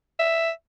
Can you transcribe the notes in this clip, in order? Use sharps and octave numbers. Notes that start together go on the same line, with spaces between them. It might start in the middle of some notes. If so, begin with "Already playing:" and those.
E5